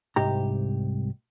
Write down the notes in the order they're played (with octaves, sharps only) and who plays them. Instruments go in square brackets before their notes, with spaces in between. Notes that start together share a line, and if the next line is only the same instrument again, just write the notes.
[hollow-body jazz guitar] C2 G#2 G4 A#5